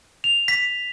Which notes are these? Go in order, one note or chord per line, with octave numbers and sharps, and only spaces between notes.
F7
B6